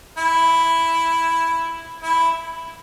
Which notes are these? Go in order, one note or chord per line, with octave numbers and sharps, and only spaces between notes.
E4
E4